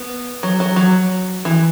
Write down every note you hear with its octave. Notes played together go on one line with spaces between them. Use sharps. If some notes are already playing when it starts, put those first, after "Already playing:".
Already playing: B3
F#3
F#3
F#3
E3